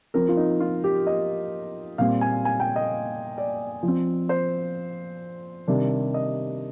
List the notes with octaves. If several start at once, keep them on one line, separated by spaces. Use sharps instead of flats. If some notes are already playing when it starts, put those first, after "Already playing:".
F3 C4 A#4
F4
D#4
F4
G4
D#5
A#2 G3 C4 F5
G#5
G#5
G5
D#5
D5
F3
C4
C5
C3 D#3 G3 D4
D#5